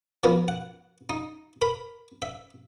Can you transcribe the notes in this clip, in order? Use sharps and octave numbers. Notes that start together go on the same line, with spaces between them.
F3 F#3 B3 A#4
F#5
D#4
A#4 B5
E5